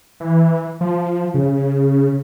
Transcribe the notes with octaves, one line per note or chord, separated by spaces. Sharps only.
E3
F3
C#3